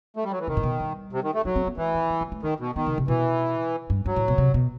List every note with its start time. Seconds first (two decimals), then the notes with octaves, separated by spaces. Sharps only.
0.16 A3
0.24 G3
0.31 F#3
0.40 E3
0.47 C3 D#3
0.57 A2
0.63 B2
0.80 G3
1.13 C3
1.24 D#3
1.34 A3
1.45 F#3 D#4
1.56 C4
1.67 B3
1.77 E3 A3
1.94 D#3
2.10 F#3
2.21 G3
2.32 A3
2.43 D#3 D#4
2.60 B2
2.75 D#3 B3
2.86 C3
2.98 C3
3.08 B2 E3
3.90 G2
4.06 G2 F#3
4.16 A2
4.28 B2
4.38 C3
4.54 B2